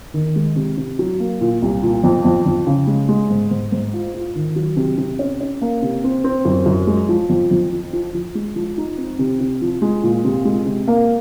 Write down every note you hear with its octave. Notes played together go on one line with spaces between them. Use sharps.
D#3
G#3
C3
C3
F#3
A#3
A#2
C2
A#2
F2
F2
F2
C#3
G#3
G#3
G#2
G#2
G#2
F4
F4
D#3
F#3
C3
C3
C#4
C#4
A#3
C3
C4
C4
F#2
F#2
G#3
F3
F2
F2
F3
F3
F3
G#3
F3
D#4
C4
C3
C3
F3
G#3
A#2
C3
G#3
C3
A#3